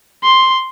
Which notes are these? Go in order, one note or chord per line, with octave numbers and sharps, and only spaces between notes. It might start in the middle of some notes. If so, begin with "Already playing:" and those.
C6